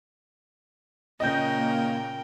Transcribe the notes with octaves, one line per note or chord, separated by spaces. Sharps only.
A#2 C#3 A#4 D#5 G5 G6
A#3